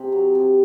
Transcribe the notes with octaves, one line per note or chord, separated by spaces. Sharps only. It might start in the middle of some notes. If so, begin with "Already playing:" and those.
Already playing: C3 G#4
F#3
C3